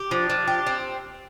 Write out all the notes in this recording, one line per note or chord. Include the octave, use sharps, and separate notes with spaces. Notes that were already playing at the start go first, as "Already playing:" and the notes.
Already playing: G4
F3 D4
F3
G4
C4